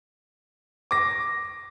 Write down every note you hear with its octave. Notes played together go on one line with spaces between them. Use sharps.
D6 A#6